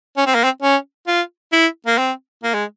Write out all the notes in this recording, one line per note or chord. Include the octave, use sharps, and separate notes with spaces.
C#4
C4
A#3
C4
C#4
F4
E4
A#3
C4
A#3
G#3